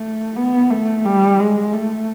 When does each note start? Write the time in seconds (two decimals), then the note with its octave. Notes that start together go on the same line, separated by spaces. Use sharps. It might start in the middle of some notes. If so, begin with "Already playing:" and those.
Already playing: A3
0.36 B3
0.70 A3
1.05 G3
1.39 G#3
1.73 A3